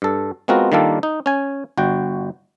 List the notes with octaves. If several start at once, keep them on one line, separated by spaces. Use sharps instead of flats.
G2 A4
G#3 B3 C4 F4 F#4 A#4
D#3 G3 A#3 D4 F4 A4
D#4
C#4 G#5
G1 F#4 G5